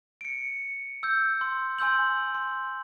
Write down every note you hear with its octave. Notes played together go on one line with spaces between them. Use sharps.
C#7 D7
E6 G6
C6
G#5 C6 E6 G6 F#7
C6